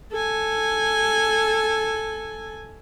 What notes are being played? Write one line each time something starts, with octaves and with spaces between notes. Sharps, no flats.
A4 G#5